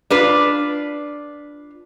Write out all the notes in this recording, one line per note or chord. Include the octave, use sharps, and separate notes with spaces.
D4 F4 B4